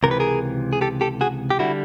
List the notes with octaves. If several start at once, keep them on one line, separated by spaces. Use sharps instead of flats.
C#2 C3 E3 A#4
B4
G#4 A#4
G#4
G4 A4
G4 A4
F#4 G#4
G4
D3 G3 E4 F#4